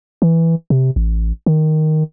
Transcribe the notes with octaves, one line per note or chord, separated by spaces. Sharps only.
E3
C3
A1
D#3